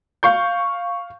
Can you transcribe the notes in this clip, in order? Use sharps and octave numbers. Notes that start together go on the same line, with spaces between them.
F5 C#6 G6